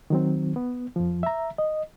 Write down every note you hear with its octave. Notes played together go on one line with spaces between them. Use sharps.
D#3 F#3 C4
B3
F2 F3
E5 A#5
D#5